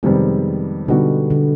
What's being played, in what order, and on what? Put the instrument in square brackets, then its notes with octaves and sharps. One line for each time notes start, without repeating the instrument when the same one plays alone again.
[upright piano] F2 C3 D#3 G3 B3 [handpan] G#3
[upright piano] B2 G3 B3 D#4 F#4 [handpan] D3
[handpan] D3